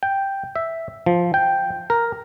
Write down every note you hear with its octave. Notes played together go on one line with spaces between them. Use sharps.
G5
E5
F3
G5
A#4